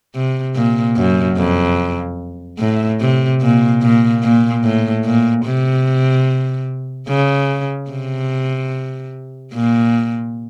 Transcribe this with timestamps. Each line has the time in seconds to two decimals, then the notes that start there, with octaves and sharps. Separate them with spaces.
0.15 C3
0.55 A#2
0.96 F#2
1.37 F2
2.59 A2
3.00 C3
3.42 A#2
3.82 A#2
4.23 A#2
4.64 A2
5.05 A#2
5.45 C3
7.08 C#3
7.90 C3
9.53 A#2